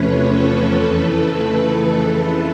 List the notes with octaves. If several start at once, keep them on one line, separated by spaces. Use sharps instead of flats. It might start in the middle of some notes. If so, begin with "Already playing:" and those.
Already playing: E2 C3 F3 A3 C#4 B4 C#5
A4 B4
F2 C#3 E3 A3